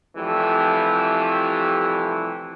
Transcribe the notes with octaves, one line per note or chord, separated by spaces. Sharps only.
C2 F2 E3 A3 G4